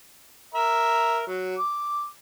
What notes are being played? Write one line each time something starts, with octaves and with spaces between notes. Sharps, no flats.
A#4 E5 A#5
F#3
D6